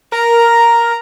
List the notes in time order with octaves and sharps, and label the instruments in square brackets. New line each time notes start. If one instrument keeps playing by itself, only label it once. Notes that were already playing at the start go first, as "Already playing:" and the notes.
[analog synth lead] A#4 [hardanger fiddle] A#5